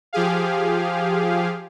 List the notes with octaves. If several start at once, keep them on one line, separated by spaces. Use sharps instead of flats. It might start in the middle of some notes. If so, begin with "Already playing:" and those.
F3 G4 G#4 F5